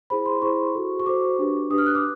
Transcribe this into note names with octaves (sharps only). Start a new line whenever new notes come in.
E4 G#4 C5 B5
C6
E4 G#4 C5 C#6
F#4 A4 C5
C#6
F#4 A4 C5 D6
D4 G4 B4
D4 G4 B4 D#6
F6
F#6
D6